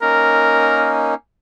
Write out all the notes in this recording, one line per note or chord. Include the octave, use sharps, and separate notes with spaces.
A#3 C#4 D#4 A#4